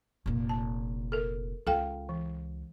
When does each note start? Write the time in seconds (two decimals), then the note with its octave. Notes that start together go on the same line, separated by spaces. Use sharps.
0.26 F1 A#2
0.49 A5
1.12 A4 A#4
1.67 C#2 F4 A4 F5 G5
2.09 E3